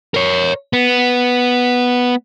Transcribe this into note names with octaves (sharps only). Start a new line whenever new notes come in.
A#4 C#5
B3